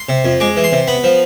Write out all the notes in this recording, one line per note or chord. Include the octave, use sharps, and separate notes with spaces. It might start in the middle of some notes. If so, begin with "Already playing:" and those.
Already playing: C6
C3
F2
G#3 D6
E3
C6
C3
B3 B5
F3